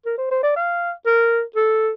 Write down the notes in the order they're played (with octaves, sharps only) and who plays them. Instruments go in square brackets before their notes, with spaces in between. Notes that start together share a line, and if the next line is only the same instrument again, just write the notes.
[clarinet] A#4
C5
C5
D5
F5
A#4
A4